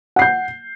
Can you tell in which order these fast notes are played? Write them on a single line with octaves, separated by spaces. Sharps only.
F#5 C7 G6